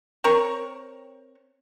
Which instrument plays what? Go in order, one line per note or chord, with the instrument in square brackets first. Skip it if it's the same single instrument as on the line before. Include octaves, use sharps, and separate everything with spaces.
[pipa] C4 A#4 C#5 C#6